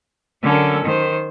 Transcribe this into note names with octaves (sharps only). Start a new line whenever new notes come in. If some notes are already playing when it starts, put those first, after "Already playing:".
D3 F#3 C#4 A4 A#4
D#3 C5